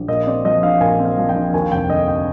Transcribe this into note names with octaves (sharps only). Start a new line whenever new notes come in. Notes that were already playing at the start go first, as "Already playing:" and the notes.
Already playing: A#1
A#2 D#5
C4 D5
F3 D#5
A#1 F5
A#2 G#5
C4
F5
F3
G5
A#1
D#2 G#5
F1 G5
D3 D#5
G5